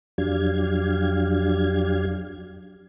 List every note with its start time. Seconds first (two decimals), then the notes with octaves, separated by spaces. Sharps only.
0.18 F2 F#3 D4 G4 F5 G#6